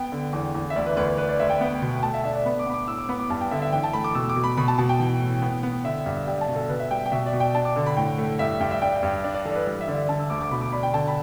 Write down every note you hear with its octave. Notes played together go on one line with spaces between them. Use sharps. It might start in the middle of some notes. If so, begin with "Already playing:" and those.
Already playing: B3 G5
D3
E2
E2
E5
D2 D5
B4
D2 B4
B4
D4 B4
D5
D2 E5
G5
B3
B2
A3 A5
E5
D4 E5
D5
B3 B5
D6
B3 B5
D6
A2 E6
D6
B3 B5
D6
G2 A5
G5
D3 E5
E5
E3 G5
A5
A3 B5
D6
B2 E6
D6
B2
B5
B2 B5
A5
B2 A5
G5
E3
A2
B3
B3
D3 E5
G2
G3 G5
A5
B2
A4
B2 B4
E5
G3 G5
G5
B2 E5
D5
B2
G5
D4 A5
D6
D3
B5
A2 G5
A3
G2 E5
G2 G5
E5
D4 G5
G5
G2
D4 D5
D5
E3 A4
D5
B4
G3 D5
E5
D3 D5
E5
D3 A5
E6
D2 D6
D6
B2 B5
D6
D4 B5
G5
D3 A5
B5